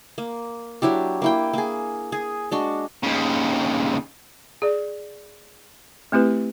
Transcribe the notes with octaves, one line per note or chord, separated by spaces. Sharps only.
A#3
F#3 D4 E4 G4
A#3 E4 G5
A#3 G#4
G#4
G#3 D4 F#4
D#2 C#3
G#4 D5
A3 C4 E4 G4 B4